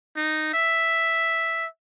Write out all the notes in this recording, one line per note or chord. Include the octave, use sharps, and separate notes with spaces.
D#4
E5